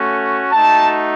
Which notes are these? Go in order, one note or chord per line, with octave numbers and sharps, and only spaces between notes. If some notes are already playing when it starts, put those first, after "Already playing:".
Already playing: A3 C#4 F#4
A3 D#4 F#4 A5